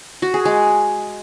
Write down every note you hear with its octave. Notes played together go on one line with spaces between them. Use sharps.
F#4
G#4
G#3